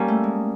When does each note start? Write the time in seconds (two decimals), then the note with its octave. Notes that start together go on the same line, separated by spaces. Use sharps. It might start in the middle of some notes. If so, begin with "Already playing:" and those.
Already playing: G3 A#3 C#4
0.08 A3
0.23 G#3